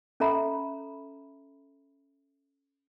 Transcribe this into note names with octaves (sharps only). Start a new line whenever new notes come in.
C#4 A4 E5 A#5 B5